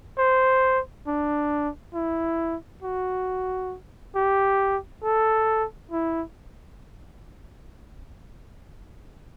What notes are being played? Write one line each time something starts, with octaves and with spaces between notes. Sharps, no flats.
C5
D4
E4
F#4
G4
A4
E4